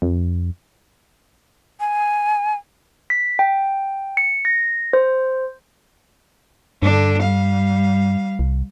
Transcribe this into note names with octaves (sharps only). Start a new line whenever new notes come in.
F2
G#5
B6
G5
C#7
A#6
C5
G2 D3 D4
G3 F5
C2